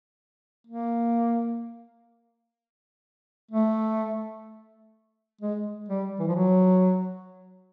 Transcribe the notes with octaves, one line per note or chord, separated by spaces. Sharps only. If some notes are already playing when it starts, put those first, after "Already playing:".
A#3
A3
G#3
G3
E3
F3
F#3